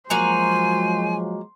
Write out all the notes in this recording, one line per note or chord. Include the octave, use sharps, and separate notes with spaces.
F3 F#3 G#3 A#3 F#4 C5 G#5 A#5